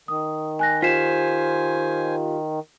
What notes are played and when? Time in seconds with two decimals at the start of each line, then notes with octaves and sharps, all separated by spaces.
0.08 D#3 D#6
0.59 G#5 F#6 A#6
0.82 F4 G4 C5 G#5 B6 C7 E7